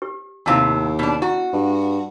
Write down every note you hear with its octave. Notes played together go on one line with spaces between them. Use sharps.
G4
D#2 A2 C3 E4 F5 A5
B2 D4
E4 F#4
G2